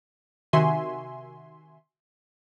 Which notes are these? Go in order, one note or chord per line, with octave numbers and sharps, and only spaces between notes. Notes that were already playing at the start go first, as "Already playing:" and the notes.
C3 D#3 F#4 E5 G#5 C6